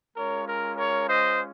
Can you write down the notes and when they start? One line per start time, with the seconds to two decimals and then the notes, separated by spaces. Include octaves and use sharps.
0.16 G#3 C#4 F4 A#4 C#5
0.46 A#4
0.77 A#4 C#5
1.08 C5 D#5